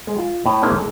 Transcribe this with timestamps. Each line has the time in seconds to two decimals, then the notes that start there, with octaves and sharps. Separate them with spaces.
0.07 G#3
0.18 F4
0.46 A2
0.62 G#3 A#3 C4 C#4 E4
0.75 G#3 A4